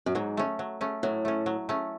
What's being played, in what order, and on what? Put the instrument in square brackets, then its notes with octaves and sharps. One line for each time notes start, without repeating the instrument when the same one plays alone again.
[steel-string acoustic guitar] F#2
[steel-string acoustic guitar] G#2 [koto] F#3
[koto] A3 C#4
F#3
A3 C#4
[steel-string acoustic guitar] A2 [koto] F#3
[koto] A3 C#4
F#3
A3 C#4